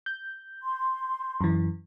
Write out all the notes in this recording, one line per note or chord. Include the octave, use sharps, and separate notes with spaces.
G6
C6
F#2 E3